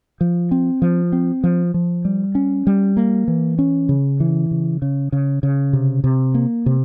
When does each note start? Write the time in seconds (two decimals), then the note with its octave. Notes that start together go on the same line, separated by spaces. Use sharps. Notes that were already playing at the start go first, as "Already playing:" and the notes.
0.21 F3
0.51 C4
0.82 F3
1.12 C4
1.44 F3
1.74 F3
2.05 G3
2.35 C#4
2.67 G3
2.97 A#3
3.28 E3
3.59 C#4
3.89 C#3
4.20 E3
4.51 C#3
4.82 C#3
5.12 C#3
5.43 C#3
5.73 C3
6.04 C3
6.35 A#3
6.66 C3